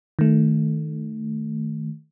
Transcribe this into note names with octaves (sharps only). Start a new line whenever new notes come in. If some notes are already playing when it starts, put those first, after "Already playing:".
D#3 A3